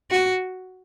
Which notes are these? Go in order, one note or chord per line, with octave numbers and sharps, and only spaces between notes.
F#4